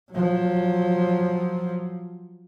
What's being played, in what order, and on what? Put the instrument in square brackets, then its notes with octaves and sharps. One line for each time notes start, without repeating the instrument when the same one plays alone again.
[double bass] F3 F#3